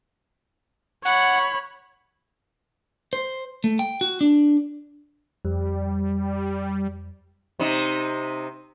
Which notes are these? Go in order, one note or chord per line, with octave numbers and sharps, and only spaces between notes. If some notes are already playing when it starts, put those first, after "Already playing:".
C#5 F#5 B5
C5
A3
G5
F#4
D4
F2 G3
C3 D#4